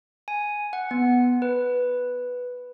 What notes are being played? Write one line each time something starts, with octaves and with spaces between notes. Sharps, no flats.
G#5
F#5
B3
B4